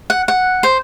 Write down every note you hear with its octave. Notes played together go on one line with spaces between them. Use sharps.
F#5
F#5
C5